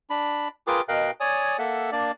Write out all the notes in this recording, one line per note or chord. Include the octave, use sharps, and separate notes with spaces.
D4 B5
F4 G#4 A#4 B4 G5 D6
B2 A#4 D#5 F5 G5 F#6
C#5 D5 G#5 D#6
A#3 A4 E5 F#5
A#3 D4 D5